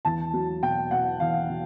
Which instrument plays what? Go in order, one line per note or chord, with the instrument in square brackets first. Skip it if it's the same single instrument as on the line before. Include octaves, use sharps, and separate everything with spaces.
[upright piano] E2 A5
F#3
B2 G5
B2 F#5
E2 F5
B2